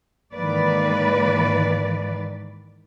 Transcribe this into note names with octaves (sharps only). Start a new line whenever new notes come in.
G#2 D#3 E3 A#3 B4 D5